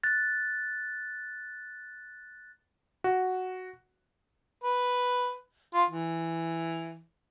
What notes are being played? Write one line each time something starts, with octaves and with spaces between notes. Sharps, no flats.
F#6 A6
F#4
B4
F4
E3